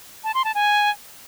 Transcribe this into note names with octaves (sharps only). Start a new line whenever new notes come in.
A5
C6
A5
G#5